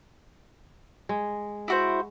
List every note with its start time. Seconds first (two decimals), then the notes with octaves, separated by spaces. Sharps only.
1.09 G#3
1.68 E4 F#4 C5